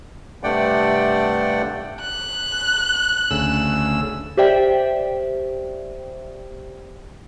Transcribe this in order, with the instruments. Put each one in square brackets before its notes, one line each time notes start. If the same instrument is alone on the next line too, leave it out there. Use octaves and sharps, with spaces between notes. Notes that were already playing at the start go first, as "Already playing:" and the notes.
[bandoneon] G2 C3 A3 D5 F#5 G5
[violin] F#6
[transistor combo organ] D2 C#3 E6
[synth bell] G4 C5 D5 E5 G5